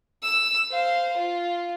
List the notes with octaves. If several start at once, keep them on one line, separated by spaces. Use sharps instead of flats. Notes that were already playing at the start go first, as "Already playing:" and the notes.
E6
C5 F5
F4